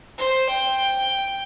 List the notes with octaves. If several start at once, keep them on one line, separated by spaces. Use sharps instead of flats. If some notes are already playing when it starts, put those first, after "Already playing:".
C5
G5